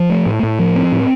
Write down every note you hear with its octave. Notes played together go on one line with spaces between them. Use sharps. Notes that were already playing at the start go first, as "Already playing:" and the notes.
Already playing: F3
A3
A2
A2
F3
C4
A2